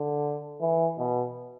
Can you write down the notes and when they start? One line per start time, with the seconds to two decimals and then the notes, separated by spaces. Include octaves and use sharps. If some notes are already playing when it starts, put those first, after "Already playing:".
Already playing: D3
0.61 E3
0.98 B2